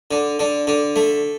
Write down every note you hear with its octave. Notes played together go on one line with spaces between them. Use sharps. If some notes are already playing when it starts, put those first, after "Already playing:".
D3
D3
D3
A3